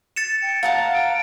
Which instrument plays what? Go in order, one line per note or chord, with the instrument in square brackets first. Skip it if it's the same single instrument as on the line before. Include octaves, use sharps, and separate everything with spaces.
[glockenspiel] A6 C#7 E7
[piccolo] G5
[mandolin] F5 F#5 A5 [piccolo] A#5
[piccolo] D7